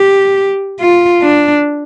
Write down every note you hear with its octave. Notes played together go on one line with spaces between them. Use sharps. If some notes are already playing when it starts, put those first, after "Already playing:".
Already playing: G4
F4
D4